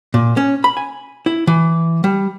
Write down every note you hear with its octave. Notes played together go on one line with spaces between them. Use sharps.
A#2
C#4
B5
G#5
E4
E3
G3